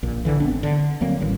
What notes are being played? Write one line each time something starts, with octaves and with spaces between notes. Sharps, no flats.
A#1 A#2
D3 E3
G#1 B3 C4 D4
D3
D2 F#3 A#3 C4
A1 D#3 G3